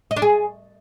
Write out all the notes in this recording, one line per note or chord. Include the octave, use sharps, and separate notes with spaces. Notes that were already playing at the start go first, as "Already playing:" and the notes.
D#5
D4
G#4